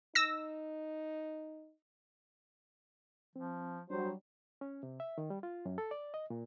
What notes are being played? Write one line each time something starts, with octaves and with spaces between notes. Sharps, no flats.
D#4 E6 A#6
F3 C4
F#3 G3 D4 C5
C#4
C3
E5
D#3
G3
F4
F#2
A4
D5
D#5
A#2